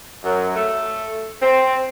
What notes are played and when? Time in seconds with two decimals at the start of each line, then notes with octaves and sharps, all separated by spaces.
0.23 F#2
0.55 A3
1.40 C4